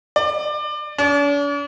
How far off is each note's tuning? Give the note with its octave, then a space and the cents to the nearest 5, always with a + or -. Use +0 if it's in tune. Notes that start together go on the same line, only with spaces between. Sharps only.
D5 +25
D4 -45